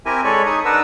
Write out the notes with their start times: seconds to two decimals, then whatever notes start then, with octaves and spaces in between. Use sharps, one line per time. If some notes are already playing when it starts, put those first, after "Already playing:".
0.06 C4 E4 G4 A#4 E5 G#5
0.24 G#3 A4 C#5 D5 B5 C#6
0.46 D#4 C#6 D#6
0.65 D4 D#4 A#4 B4 F#5 E6